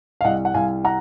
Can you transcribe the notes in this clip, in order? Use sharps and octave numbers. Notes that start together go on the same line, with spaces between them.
F5
C2 D#5 F#5
F#5
C2 F5 G#5
F#5 A#5